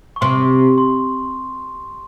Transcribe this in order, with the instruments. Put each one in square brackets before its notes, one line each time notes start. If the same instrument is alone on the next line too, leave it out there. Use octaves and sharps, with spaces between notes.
[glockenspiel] C#6
[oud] C3 [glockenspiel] C6
[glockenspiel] C6